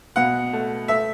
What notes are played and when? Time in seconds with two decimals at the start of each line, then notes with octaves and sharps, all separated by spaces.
0.16 B2 F#5
0.53 A3
0.88 A3 E5